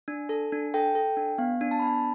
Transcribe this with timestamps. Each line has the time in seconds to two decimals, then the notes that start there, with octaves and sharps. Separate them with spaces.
0.08 D4
0.29 A4
0.52 D4
0.74 A4 G5
0.95 A4
1.17 D4
1.38 B3 F5
1.61 D4
1.71 A5
1.79 B3 B5
1.87 A5